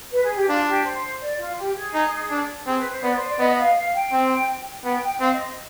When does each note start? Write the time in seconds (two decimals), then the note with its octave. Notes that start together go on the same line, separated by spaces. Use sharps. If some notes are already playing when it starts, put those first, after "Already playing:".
0.12 B4
0.24 G#4
0.36 G4
0.48 D4 F4
0.67 G4
0.84 C5
1.21 D5
1.39 F4
1.57 G4
1.76 G#4
1.94 D#4
2.30 D4
2.66 C4 G#4
2.78 B4
2.91 C5
3.03 B3 D5
3.15 C5
3.27 D5
3.39 B3 D#5
3.58 F5
3.76 F5
3.93 G5
4.12 C4
4.84 B3 G5
5.02 G5
5.20 C4 F5
5.33 D#5